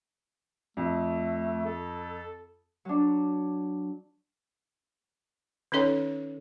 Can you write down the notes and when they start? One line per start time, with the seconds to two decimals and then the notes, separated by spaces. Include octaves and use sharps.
0.77 F2 A3
1.66 A4
2.85 F#3 D4
5.72 D#3 C#4 D#4 A4 C#5